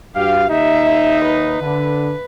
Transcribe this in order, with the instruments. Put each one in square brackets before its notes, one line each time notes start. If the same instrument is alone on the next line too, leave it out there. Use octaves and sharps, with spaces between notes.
[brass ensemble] G2 F#4 F5 [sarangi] G4
[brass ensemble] D#2 D#4 [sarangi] E5
[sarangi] B4
[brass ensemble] D3